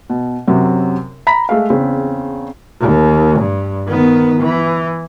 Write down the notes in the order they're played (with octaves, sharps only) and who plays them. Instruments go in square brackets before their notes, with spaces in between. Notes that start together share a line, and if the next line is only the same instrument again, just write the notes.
[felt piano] B2
F#2 C3 F#3
A#5 B5 B6
G#3 A3 F5
E2 C#3 C4
[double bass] D#2
G2
D#3 B3
E3